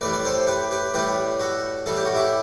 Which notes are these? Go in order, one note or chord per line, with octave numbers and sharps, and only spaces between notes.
A2 E3 G3 B4 D5
D5
A4 C5
G4 B4
G4 B4
A2 E3 G3 G4 B4
F#4 A4
A2 E3 G3 A4
G4
F#4
E4 G4